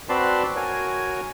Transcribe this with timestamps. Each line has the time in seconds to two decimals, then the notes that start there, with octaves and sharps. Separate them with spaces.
0.09 C4 F#4 B4 D5 A5 C6
0.56 F#4 A#4 C#5 G#5